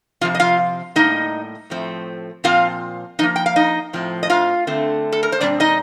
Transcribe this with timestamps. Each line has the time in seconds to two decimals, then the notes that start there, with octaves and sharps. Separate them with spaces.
0.21 C3 F3 C4 F4 F5
0.35 D#5
0.40 F4 F5
0.96 A2 G3 A#3 D#4 D#5
1.70 A2 F3 A3 C4
2.44 A#2 F3 C4 F4 F5
3.19 A2 F3 A#3 D#4 D#5
3.36 G5
3.46 F5
3.56 D#4 D#5
3.93 A2 F3 C4
4.23 D#5
4.30 F4 F5
4.67 D3 A3 C4
5.12 A4
5.23 A#4
5.32 C5
5.41 A#2 G3 C4 D4 D5
5.60 D#4 D#5